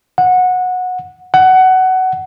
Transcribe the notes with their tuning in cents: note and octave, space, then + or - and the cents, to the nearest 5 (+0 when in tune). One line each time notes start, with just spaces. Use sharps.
F#5 -20
F#5 +15